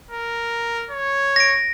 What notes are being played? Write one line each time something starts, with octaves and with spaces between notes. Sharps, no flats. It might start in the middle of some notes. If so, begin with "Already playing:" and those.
A#4
C#5
A#6 D7